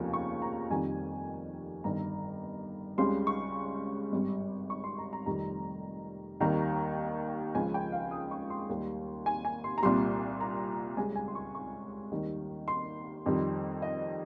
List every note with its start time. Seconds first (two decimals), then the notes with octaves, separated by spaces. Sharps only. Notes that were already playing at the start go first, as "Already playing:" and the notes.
Already playing: F1 D#2 C#3 F3
0.13 C#6
0.42 A#5
0.70 F1 F2 D#3 G3 G#5
1.84 G1 G2 D#3 A#5
2.98 C#2 C#3 G3 C6
3.27 C#6
4.12 G#1 G2 G3
4.70 C#6
4.84 C6
4.99 A#5
5.13 A#5
5.26 F1 F2 D#3 G3 A#5
6.40 D#2 D#3 G3 A#5
7.54 C#2 C#3 F3 G#5
7.74 G5
7.92 F5
8.11 D#6
8.31 C#6
8.50 C6
8.69 D#2 D#3 G3
9.26 G#5
9.45 G#5
9.64 C6
9.78 A#5
9.83 C2 A#2 G3 C6
10.41 A#5
10.97 C#2 C#3 G3 G#5
11.16 G#5
11.28 C6
11.35 C#6
11.55 C#6
12.12 D#2 D#3 G3
12.68 C6
13.26 F2 D#3 G3
13.82 D#5